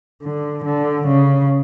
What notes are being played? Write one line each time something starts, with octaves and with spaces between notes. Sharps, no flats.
D3
D3
C#3